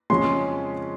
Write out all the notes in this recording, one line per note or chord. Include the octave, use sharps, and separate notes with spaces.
F2 C#3 F3 G#3 C#4 C6